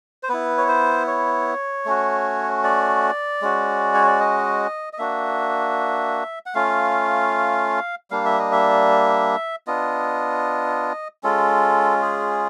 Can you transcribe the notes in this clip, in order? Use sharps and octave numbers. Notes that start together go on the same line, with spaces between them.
C5
B3 E4 B4
C#5
C5
C#5
A3 C#4 F#4
D5
G#3 C#4 F#4
C#5
D5
D#5
D#5
A#3 D4 F#4 E5
F#5
A3 C#4 F4 F5
G3 A#3 D4 F5
E5
D#5
E5
B3 D4 F4 D#5
G#3 C#4 F4 A4
G#4